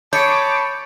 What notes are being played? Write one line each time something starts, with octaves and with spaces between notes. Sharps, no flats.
G#4 C#5 A5 B5 D6 G6 C#7